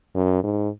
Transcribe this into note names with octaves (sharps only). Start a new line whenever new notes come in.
F#2
G#2